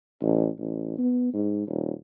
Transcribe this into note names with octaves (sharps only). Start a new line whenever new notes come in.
A1
A1
B3
G#2
D#1